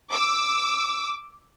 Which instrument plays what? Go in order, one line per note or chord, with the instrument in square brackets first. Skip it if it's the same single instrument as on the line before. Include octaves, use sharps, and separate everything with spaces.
[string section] D6 E6